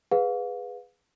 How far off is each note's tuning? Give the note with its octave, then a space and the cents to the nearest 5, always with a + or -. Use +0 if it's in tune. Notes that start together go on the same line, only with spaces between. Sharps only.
G#4 -5 B4 +10 F5 +35